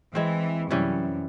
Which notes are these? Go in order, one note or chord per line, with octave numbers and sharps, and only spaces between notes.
E3 G#3 C4
F#2 C3 E3 G3 C#4